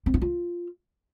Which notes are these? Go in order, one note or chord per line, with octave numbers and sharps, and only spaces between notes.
C4
E4
F4